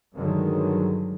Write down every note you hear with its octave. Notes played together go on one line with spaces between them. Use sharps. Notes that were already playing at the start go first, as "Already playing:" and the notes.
G2 D3 D#3 F#3 G#3